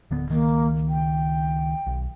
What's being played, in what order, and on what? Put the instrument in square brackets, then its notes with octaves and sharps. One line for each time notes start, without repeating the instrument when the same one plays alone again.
[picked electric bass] D1 D3 B3
[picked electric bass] C#2 D#3 [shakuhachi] A#3
[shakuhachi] G5
[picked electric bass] B1